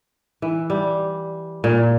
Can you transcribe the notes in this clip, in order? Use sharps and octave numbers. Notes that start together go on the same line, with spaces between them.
E3
G3
A#2